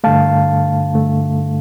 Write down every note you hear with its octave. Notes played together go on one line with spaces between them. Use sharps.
G2 D3 A3 F5 A5
G2 D3 A3